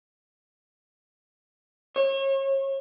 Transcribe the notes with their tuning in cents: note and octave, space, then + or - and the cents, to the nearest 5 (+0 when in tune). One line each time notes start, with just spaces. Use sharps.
C#5 -35